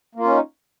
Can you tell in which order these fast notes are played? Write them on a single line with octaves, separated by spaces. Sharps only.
A#3 F4 C#4 D#4